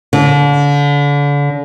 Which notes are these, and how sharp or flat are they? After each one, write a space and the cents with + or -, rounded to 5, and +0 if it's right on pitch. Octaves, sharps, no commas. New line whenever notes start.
D3 -35